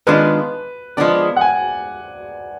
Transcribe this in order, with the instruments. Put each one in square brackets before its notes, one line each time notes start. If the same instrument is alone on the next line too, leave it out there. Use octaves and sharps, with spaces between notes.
[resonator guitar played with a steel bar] D#3 G#3 B3 D4 F4 [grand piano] B4
[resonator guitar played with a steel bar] F3 G#3 B3 D4 [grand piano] D5
[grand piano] F#5
G#5